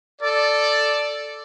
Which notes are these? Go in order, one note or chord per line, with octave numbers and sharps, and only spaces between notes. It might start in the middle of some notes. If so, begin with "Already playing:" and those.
A4 D5